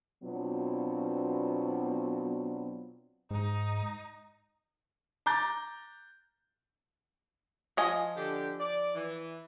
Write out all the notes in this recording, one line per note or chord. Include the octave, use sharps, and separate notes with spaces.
B2 F#3 B3 C4 D4 F4
G#2 D#4
A#5 D6 G6 A6
F3 D#5 G#5
D3 G4
D5
E3